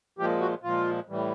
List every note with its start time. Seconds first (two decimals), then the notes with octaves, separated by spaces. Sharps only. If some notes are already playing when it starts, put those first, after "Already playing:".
0.18 A#2 F3 G#3 G4
0.40 F#4
0.63 A#2 F3 G#3 F4
1.09 A2 E3 G3